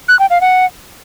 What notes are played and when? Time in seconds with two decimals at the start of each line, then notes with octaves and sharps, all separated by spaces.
0.08 F#6
0.19 G5
0.30 F5
0.41 F#5